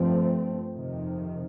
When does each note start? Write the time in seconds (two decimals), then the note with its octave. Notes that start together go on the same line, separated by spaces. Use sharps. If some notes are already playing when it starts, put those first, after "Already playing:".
Already playing: G2 F3 A3 C4
0.74 F2 C3 D#3